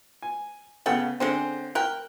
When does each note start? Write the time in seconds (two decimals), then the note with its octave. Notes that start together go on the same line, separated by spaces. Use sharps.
0.22 G#5
0.86 C#3 B3 A4 F#5 G5
1.20 D3 G#3 C4 C#4 C5
1.75 A#4 G5 F#6